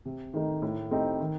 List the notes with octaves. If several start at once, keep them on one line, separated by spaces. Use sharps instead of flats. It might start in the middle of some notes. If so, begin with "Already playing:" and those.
C3
D#3 A3 D#4
A2
A3 C4 D#4 G4
D#3